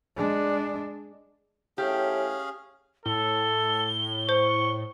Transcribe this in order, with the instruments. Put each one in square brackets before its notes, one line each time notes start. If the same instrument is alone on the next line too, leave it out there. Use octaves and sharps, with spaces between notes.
[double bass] G#3 D4
[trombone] A2 [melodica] C#4 G#4 F5 [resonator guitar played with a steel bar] G4
[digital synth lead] A2 [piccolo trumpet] A4 [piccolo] G7
[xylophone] C5 [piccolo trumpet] C#6